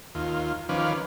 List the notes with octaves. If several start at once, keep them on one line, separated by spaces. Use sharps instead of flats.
D#2 F4
D#3 F3 C#4 B4 F5 D6